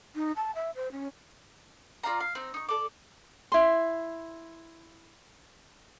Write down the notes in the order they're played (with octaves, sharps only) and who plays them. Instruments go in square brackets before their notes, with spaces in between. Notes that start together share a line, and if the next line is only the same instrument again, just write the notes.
[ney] D#4
A5
E5
C5
C#4
[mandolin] F4 D5 F5 A#5
F5
C4 D#4
D#4 C#6
A4 D5 D6
[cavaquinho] E4 C6